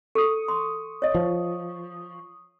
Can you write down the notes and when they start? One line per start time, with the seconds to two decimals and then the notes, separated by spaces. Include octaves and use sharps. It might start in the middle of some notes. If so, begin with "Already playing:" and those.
0.15 A4 C#6 D#6
0.48 C6
1.02 C#5 D#5
1.15 F3